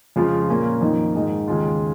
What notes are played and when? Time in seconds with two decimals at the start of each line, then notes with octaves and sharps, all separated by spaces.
0.16 F2 C#3 F3 G#3 F4
0.49 A#2 A#3 C#4 F4
0.81 F2 D#3 A#3 D#4
1.15 G#2 D#3 G#3 D#4
1.48 D#2 C#3 G#3 F4